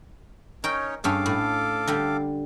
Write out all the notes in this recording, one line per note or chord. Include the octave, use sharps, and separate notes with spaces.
C#4 D#4 A#4 C#5 G5
G2 C#4 G#4 A4 F5 D6
A2
D3 G3